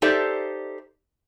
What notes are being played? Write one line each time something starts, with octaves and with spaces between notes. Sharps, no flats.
D#4 G4 A4 C5 D5 E5